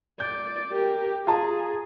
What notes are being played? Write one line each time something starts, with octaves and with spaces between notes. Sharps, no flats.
D5 G6
G4 A#4
F4 G#4 A5 A#5